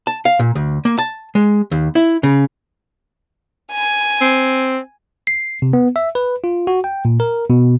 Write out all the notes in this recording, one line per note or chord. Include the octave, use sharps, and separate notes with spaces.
A5
F5
A#2
D2
A#3
A5
G#3
D#2
E4
C#3
G#5
C4
C7
C3
B3
E5
B4
F4
F#4
G5
A#2
A#4
B2